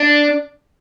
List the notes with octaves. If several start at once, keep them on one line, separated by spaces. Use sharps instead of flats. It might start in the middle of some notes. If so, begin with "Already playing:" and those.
Already playing: D4